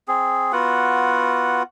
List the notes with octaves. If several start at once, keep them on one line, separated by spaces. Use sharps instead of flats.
C4 G#4
B3 F4 F#4 F#5